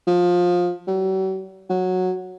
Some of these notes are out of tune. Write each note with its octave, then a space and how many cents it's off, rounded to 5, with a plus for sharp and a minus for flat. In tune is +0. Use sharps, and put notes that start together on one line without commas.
F3 +20
F#3 +45
F#3 -10